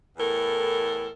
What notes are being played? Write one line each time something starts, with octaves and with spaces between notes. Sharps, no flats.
E2 A2 A4 A#4